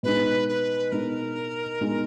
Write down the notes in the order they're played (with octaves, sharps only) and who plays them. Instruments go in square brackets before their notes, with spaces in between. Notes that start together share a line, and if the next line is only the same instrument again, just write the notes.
[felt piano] B2 G#3 D#4 [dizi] B4
[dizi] B4
[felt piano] B2 G#3 D#4 [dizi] A#4
[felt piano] B2 G#3 D#4